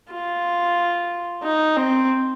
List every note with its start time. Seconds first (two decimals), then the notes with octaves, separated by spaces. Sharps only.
0.11 F4
1.43 D#4
1.76 C4